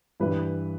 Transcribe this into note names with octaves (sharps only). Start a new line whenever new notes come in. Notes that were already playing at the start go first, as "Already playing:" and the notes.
G2 E3 G3 E4 B4